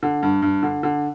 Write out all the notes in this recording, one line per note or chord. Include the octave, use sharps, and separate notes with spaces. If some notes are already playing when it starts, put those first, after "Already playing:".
D3
G2
G2
D3
D3